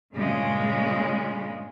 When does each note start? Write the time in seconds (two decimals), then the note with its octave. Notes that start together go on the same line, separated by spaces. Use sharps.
0.13 G2 A#2 C#3 G#3